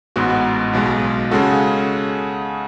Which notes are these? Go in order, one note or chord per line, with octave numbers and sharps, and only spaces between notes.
A1 G#2 G#3 B3 F#4
B1 B2 G#3
C#3 G#3 C#4 F#4 A4